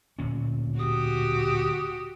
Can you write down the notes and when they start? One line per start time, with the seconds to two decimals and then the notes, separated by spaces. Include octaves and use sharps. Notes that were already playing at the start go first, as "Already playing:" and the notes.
0.19 D1 A#2 C#4
0.78 F#4 G4 D#6